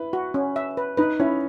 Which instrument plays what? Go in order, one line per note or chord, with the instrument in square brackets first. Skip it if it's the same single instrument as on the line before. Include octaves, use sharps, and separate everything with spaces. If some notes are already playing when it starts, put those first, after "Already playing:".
Already playing: [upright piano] E4 B4
[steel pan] F#4
C#4
E5
B4
[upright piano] D#4 [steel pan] B4
[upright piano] C#4 [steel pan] E4